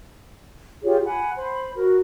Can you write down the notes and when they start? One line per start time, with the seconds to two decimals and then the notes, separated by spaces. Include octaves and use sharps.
0.83 F4 G4 G#4 C#5
1.05 F#5 G#5 B5
1.36 C5 B5
1.75 F#4 A#4